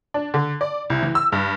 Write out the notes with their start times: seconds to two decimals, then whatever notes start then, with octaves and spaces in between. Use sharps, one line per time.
0.14 D4
0.34 D3
0.61 D5
0.90 C2
1.03 E3
1.15 E6
1.32 G2